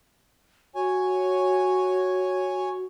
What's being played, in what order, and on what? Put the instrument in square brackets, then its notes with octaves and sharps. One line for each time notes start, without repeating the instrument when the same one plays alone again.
[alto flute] F#4 [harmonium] C#5 G#5